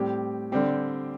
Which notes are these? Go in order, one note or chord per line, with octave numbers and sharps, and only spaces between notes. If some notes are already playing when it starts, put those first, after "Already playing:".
Already playing: A2 G3 C4 G4
D3 G3 C4 G4